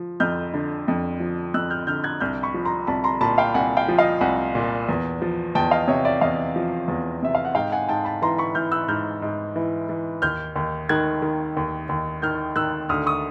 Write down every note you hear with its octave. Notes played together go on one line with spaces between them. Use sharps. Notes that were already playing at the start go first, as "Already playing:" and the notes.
Already playing: F3
F2 F6 G6
D3
F2
F3
F2 E6 F#6
F6 G6
D3 F6 G6
F#6 G#6
C2 F6 G6
B5 C#6
F3
A#5 C6
C2 A5 B5
A#5 C6
A#2 A5 B5
F5 G5
C2 F#5 G#5
F5 G5
F3
D#5 F5
C2 F#5 G#5
A#2
E2
F3
E2 G5 A5
D#5 F5
C3 C#5 D#5
D5 E5
E2 D#5 F5
F3
E2
C3 E5
F5
F#5
G#2 F5 G5
F#5 G#5
G#2 G5 A5
A5 B5
E3 A#5 C6
B5 C#6
E3 F6 G6
E6 F#6
G#2 F6 G6
G#2
E3
E3
D#2 F6 G6
D#2
D#3 F#6 G#6
D#3
D#2
D#2
D#3 F6 G6
D#3 E6 F#6
D2 D#6 F6
C#6 D#6